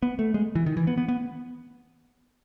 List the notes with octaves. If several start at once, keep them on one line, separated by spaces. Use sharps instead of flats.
B3
A3
G#3
E3
D#3
E3
B3
B3
B3